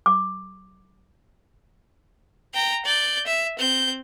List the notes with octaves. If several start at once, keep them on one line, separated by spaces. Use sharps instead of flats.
D6
G5 A#5
D5 G6
E5
C4 G6